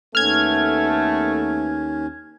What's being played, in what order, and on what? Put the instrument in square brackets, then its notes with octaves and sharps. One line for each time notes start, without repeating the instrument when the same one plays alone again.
[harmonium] D#2 C#4 [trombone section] A3 B3 [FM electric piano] F6 G#6